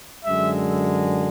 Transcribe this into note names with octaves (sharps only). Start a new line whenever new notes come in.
F#2 D3 G#3 E5